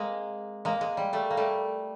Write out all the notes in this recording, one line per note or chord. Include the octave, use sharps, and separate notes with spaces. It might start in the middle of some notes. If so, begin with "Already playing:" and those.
Already playing: G#3 A#3 C4
G#3 A#3
G#3
G3
G3 A3
A#3
G3 A3